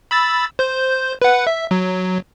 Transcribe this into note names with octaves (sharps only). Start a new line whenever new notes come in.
B5 E6 A6
C5 G6
B4 F#5
E5
F#3